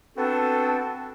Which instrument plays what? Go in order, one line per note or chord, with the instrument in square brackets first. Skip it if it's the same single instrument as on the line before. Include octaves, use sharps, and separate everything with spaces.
[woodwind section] B3 C4 D4 F#4 A4